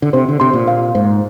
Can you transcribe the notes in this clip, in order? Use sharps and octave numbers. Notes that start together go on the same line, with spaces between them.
D3
C3 C5
D3
C3 C6
A#2
F5
G#2 C5